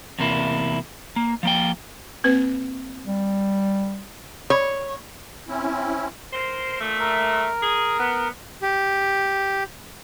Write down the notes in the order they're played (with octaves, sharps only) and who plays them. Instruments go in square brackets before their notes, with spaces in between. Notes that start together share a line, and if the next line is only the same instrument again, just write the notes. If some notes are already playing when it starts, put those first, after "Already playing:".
[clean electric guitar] E2 C3 A#3 E4
A#3
F3 A#3 G5
[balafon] A#3 C4 B4
[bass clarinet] G3
[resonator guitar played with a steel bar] C#5
[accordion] C4 C#4 E4
[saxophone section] A#4 C5
A#2 A3
[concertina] A#4
[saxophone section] G#4
B3
[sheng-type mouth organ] G4